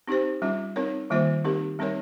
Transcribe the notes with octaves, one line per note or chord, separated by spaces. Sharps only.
C4 D#4 G4 C5
G3 C#4 F4
C4 D#4 A#4 C#5
D#3 G3 A#3 F4 C5
C4 D#4 G4 A#4
G3 C4 D#4 A#4 C#5